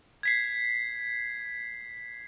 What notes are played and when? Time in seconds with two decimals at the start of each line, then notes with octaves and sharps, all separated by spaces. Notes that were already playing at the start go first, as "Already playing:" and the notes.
0.23 G#6 B6 C7